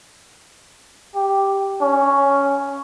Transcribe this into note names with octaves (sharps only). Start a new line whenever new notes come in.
G4
C#4